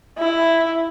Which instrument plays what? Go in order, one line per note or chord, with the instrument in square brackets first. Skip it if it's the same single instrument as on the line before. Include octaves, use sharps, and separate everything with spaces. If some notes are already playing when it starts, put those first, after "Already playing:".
[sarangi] E4